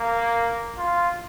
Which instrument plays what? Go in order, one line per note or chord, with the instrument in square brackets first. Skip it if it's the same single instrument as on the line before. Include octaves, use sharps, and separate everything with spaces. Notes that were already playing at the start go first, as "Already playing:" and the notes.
Already playing: [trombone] A#3
F4